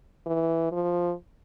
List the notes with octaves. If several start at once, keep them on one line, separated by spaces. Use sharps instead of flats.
E3
F3